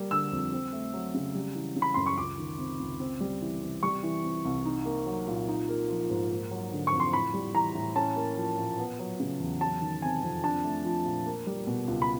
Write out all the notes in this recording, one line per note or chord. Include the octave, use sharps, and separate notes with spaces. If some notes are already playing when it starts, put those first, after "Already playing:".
Already playing: G3 A#3
D3 E6
F2
C4
A3
F#3
C#3
G3
E3
C#3
B5
F#2 C6
C#6
C#2 D6
D#3
C3
C#2
C4
G3
E3
C3
G3 C#6
E3
C3
C2
D#4
A#3
F#3
A#2
D#4
A#3
F3
G#2
A#3
F#3
D3
C#6
F2
C6
A2 B5
G3
E3 A#5
A2
C#4 A5
A#3
F3
A#2
B3
F#3
C#3
E2
F#3 A5
D#3
C3 G#5
F2
D4 A5
A3
F3
A#2
A#3
G3
B2
C#2
B5